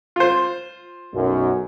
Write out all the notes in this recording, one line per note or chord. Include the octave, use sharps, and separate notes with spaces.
F4 C5
B1 F#2